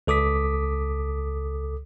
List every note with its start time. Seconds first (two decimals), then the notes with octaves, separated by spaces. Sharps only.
0.07 C#2 A4 D6 D#6 B6